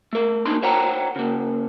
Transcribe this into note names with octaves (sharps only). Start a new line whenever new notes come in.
A3 A#4
A#3 D4 D#4 C6
C5 C#5 F#5 G5 A#5
C#3 A#3